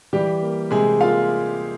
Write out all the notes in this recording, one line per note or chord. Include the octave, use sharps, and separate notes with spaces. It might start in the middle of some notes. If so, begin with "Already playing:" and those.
E3 G3 G4
A#3
C3 G#3 G#4
A#3 F4 F5